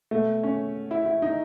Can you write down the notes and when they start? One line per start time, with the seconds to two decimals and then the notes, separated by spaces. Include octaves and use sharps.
0.11 B2 A3
0.43 C#4
0.91 E4
1.06 E4
1.22 D#4